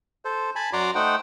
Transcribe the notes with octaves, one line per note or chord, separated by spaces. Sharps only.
A4 C5
G#5 A5 B5
F#2 F#4 D5 A#5 C6 D6
A3 D#4 C5 F#5 G5